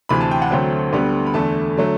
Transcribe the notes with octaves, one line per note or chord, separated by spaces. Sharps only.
D2 C3 E3 B5
A5
G5
F#5
D2 D3 F#3 A3 C4 G5
D2 D3 G3 B3
B5
E2 D3 A3 A5
D3 F#3 A3